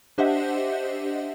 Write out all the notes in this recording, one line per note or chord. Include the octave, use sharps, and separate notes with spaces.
D4 G4 C5 D#5 E5 F#5